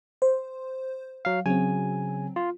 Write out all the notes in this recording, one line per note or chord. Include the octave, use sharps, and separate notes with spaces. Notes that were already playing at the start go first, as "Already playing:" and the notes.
C5
F#3 F5
C#3 F#3 C4 G#5
F4